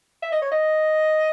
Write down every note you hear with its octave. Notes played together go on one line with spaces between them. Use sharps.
E5
D#5
C#5
D#5